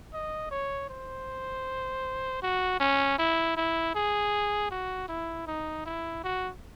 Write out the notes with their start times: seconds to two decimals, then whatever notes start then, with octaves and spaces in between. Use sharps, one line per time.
0.13 D#5
0.51 C#5
0.89 C5
2.42 F#4
2.80 C#4
3.18 E4
3.57 E4
3.95 G#4
4.71 F#4
5.09 E4
5.47 D#4
5.86 E4
6.24 F#4